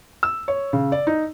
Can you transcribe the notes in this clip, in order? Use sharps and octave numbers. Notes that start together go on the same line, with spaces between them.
E6
C#5
C#3
D5
D#4